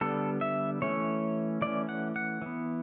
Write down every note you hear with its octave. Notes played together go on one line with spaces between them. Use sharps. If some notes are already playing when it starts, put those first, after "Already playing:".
D3 G3 B3 A4
E5
E3 A3 C#4 C#5
E3 A3 C#4 D5
F#5
F#5
E3 B3